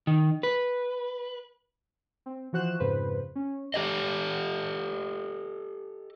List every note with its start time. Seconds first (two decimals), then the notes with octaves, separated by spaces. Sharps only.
0.07 D#3
0.43 B4
2.26 C4
2.53 E3 F3 F#4 C5 F#6 E7
2.80 F2 G#2 C#3 B4 C5
3.35 C#4
3.74 G4 A4 D#5